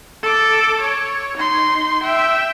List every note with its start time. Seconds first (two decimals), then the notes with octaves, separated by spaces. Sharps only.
0.23 A4 D6
0.81 C#5
1.37 D#4 C6
2.03 E5 G5